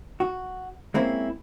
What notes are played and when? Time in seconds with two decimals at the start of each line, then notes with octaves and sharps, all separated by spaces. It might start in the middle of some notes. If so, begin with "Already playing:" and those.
0.20 F#4
0.94 G#3 A#3 C4 C#4 E4